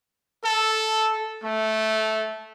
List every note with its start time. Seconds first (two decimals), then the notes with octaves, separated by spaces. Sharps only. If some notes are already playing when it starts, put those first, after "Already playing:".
0.44 A4
1.44 A3